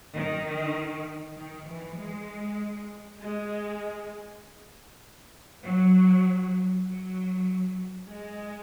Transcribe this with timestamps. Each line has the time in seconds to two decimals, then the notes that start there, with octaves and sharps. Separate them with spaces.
0.15 D#3
1.37 D#3
1.68 E3
1.98 G#3
3.21 G#3
5.65 F#3
6.87 F#3
8.08 G#3